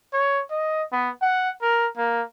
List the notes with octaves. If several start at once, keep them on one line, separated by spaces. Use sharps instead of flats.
C#5
D#5
B3
F#5
A#4
A#3